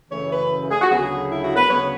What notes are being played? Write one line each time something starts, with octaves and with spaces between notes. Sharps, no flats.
F#2 C#3 E3 A3 C#5
B4
G#4
F#4
D2 C#3 F#3 B3 G#4
E4
F#4
B4
D2 C#3 F#3 B3 C#5